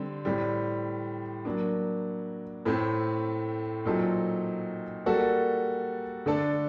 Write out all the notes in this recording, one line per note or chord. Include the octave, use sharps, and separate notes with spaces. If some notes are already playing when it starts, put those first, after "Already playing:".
Already playing: D3 G3 C4
A2 G3 C4
F#3 A#3 D4
A2 A3 C4
A#2 F#3 C4 D#4 A4
G3 A#3 F#4 A4
D3 A3 D4 A4